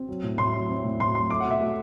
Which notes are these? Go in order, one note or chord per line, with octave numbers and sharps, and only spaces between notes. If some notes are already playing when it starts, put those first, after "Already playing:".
Already playing: C4
F#3
A2
A2 C6
F#3
C4
A2
A2 C6
F#3 C6
A3 D6
F#5
B2
E5
A3